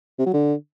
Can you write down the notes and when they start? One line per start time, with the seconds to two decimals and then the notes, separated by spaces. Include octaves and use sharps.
0.19 C3
0.26 F#3
0.33 D3